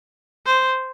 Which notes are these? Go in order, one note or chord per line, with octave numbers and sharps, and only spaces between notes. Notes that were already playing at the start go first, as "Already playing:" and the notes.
C5